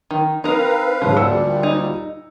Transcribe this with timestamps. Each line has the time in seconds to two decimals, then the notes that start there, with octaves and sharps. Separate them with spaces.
0.11 D#3
0.44 C4 D#4 A#4 B4 F5
1.02 G#2 C#3 F3
1.17 D2 A#2 G3 E6 C#7
1.63 D#4